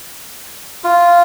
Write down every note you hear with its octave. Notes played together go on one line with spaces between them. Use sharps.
F4